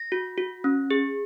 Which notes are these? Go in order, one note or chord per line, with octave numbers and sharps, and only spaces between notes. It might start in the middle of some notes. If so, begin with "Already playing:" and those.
Already playing: A#6
F#4
F#4
C#4
G#4